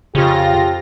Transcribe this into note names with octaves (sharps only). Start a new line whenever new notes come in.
F2 C#3 F4 G4 A#6